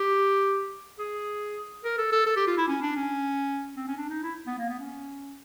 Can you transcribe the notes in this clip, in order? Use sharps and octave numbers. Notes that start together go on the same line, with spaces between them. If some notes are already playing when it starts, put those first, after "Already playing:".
Already playing: G4
G#4
A#4
A4
A4
A4
G4
F4
E4
C#4
D4
C#4
C4
C#4
D4
D#4
E4
B3
A#3
B3
C#4